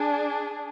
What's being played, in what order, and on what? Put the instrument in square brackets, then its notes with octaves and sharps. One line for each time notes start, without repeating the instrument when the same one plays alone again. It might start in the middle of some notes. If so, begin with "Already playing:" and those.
Already playing: [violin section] D4 G#4